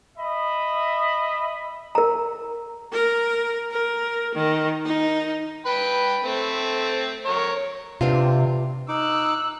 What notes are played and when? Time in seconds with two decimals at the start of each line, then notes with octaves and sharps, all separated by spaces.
0.17 D#5 E5 B5
1.95 A#4 A#5
2.92 A#4
3.71 A#4
4.35 D#3
4.85 D#4
5.66 B4 G5 B5
6.25 A3 C4
7.26 A#4 C#5
8.01 C3 B3 D4 F4
8.89 D#4 D6 E6 F#6